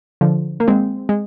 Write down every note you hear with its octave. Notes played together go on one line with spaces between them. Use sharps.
D3 F3
A#3
G#3 C4
G#3